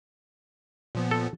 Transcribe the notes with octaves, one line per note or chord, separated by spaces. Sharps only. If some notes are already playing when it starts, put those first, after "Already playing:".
A#2 F3 B3
A4